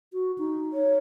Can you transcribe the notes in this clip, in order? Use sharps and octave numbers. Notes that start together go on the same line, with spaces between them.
F#4
D#4
C#5